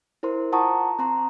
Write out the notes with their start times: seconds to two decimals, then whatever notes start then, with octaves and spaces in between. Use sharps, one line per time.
0.23 E4 A#4 C5 C6
0.52 F4 F#5 A5 A#5 C#6 D#6
0.99 C4 A#5 C6